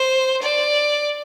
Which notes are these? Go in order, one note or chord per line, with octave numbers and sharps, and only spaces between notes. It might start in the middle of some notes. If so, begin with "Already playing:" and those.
Already playing: C5
D5